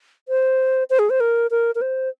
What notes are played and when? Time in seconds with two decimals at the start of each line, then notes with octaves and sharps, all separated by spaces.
0.29 C5
0.90 C5
0.99 G#4
1.10 C5
1.20 A#4
1.51 A#4
1.75 A#4
1.81 C5